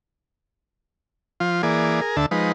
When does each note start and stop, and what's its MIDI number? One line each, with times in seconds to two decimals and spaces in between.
1.40 1.62 53
1.40 1.62 65
1.63 2.01 52
1.63 2.01 58
1.63 2.01 68
1.63 2.01 74
2.01 2.16 68
2.01 2.16 70
2.17 2.26 38
2.17 2.26 50
2.17 2.26 76
2.17 2.26 81
2.31 2.52 53
2.31 2.52 56
2.31 2.52 63
2.31 2.52 71